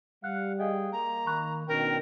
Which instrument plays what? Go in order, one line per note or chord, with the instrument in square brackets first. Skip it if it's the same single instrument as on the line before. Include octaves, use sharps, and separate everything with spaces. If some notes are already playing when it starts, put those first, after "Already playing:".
[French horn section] G3 [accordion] F5 F#5 [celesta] F#6
[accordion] G#4 G5 [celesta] D#5 F5
[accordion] A#3 [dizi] A#5
[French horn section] D#3 [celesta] B5 C#6 F#6
[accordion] B2 D#3 G5 [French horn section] C#4 D4 [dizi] A#4